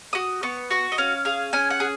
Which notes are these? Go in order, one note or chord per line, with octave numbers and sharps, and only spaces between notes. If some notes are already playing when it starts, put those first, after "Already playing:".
F#4 D#6
B3 C#6
F#4 C#6
D#5
C#4 F5
G#4 F5
C#4 G#5
F#5
G#4